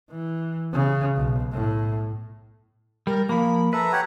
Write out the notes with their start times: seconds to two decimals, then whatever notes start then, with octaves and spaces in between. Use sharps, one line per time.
0.10 E3
0.73 C#3
1.17 B1
1.52 A2
3.07 G3 A#4
3.29 F3 A#3 B5
3.73 A4 B4 E5 A#5
3.92 G4 C#5 F#5